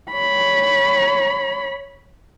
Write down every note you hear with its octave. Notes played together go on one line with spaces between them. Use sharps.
C#5 B5